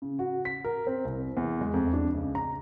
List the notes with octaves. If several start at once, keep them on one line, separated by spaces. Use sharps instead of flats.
C#3
F#4
B6
A#4
C4
C2
E2
G#3
F2
D4
C#2
A#5